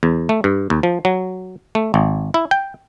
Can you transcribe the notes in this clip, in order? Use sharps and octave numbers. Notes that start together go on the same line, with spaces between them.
E2
A3
G2
D#2
F3
F#3
A3
G#1
E4
G5